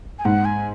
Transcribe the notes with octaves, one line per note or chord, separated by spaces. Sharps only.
G#5
G#2 F#5
G#5